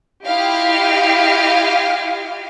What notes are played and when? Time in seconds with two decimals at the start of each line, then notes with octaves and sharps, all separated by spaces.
0.24 E4 F4 G4 D#5 F5